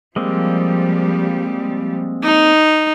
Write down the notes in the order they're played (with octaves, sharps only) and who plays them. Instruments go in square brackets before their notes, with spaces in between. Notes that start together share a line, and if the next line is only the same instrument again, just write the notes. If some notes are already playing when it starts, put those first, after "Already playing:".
[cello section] F3 G3 [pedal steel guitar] G#3 A#3 C4
[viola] D#4